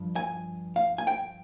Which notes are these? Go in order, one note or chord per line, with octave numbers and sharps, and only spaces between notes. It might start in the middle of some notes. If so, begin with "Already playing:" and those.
Already playing: G2 F3
G#5
F5
G#5
G5